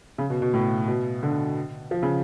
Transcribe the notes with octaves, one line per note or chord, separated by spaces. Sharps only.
C#3
B2
B2
A2
B2
D3
F3
C#3